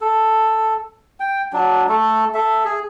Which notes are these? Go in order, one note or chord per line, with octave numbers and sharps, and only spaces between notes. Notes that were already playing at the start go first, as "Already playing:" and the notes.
A4
G5
F#3 D4
A3 A4
A4 E5
G#4